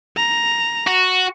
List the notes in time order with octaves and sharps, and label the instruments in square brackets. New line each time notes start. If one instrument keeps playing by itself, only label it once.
[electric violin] A#5
[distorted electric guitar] F#4